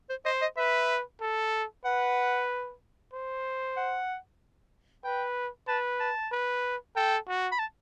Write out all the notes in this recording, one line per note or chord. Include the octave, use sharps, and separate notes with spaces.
C5
C5 D#5
D#5
B4 E5
A4
B4 F#5
C5
F#5
B4 G5
B4 A5
A5
B4
A4 G5
F#4
B5
A5